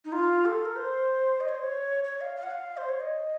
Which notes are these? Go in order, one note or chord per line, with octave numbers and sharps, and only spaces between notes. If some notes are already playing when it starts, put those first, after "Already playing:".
D#4
F4
A4
A#4
C5
D#5
C#5
C5
C#5
C#5
F5
F5
F#5
F5
C5
C#5
D#5